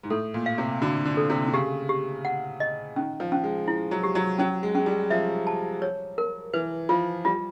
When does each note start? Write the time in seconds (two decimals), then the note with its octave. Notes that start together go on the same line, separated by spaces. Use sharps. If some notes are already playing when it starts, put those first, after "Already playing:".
0.03 G#2
0.10 A2 A4
0.34 A#2
0.46 F5
0.58 C3
0.82 D3 F#4
1.05 D3
1.17 A4
1.30 C3
1.47 D3
1.53 C#3 G4
1.89 G4
2.25 F#5
2.60 D#5
2.96 D#3 C#4
3.20 F3
3.32 C#4
3.44 G#3
3.68 E4
3.91 F#3
4.03 G4
4.15 F#3
4.39 F#3 C#4
4.63 G#3
4.75 G#3 C#4
4.86 G3
5.10 F3 E5
5.47 A5
5.82 C#5
6.18 A#4
6.53 E3 B4
6.89 F3 F4
7.25 G3 F4